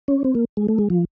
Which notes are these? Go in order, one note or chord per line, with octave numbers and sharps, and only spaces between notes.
C#4
C4
A#3
G#3
A3
G#3
F3